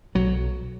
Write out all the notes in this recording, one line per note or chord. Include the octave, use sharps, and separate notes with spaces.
B1 F#3